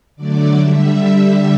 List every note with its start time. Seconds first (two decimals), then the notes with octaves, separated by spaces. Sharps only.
0.16 D3 F#3 A3 D5
0.56 D3 G3 E5